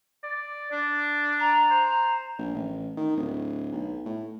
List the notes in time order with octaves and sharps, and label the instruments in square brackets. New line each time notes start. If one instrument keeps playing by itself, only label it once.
[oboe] D5
D4
[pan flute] A#5
[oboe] C5
[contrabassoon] A#1
A1
D#3
D1
B1
A2